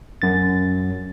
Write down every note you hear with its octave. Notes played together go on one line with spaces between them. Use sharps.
F#2 A6